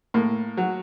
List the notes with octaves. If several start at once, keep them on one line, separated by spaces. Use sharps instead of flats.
A2 A#3
F#3